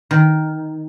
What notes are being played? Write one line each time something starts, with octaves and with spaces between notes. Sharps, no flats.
D#3